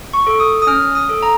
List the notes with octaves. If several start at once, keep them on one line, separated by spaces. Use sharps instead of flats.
C#6
A4
D#6
D#6
C#4 F6
D#6
A4
A#5